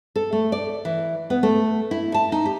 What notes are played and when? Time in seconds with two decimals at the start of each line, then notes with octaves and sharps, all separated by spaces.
0.16 A4
0.33 A3
0.52 D5
0.85 E3
1.30 B3
1.43 A3
1.91 E4
2.14 A5
2.32 D#4
2.45 G4